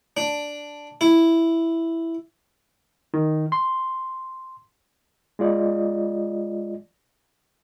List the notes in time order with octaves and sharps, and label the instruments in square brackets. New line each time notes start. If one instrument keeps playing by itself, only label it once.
[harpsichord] D4
E4
[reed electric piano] D#3
C6
G#3 F4 D5 D#5